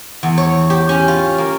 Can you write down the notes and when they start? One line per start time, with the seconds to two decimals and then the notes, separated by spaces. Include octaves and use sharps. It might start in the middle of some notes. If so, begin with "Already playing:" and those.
0.23 E2
0.38 C#5
0.70 G4
0.89 C#4
1.08 F4
1.38 A#3